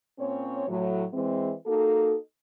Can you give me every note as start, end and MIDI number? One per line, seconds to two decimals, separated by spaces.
0.18 0.67 46
0.18 0.67 60
0.18 0.67 61
0.18 0.67 73
0.67 1.03 45
0.67 1.03 54
1.13 1.52 52
1.13 1.52 56
1.13 1.52 60
1.66 2.14 58
1.66 2.14 63
1.66 2.14 66
1.66 2.14 69